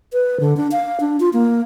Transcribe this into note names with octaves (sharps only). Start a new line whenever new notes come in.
B4
D3
D4
F5
D4
F4
A#3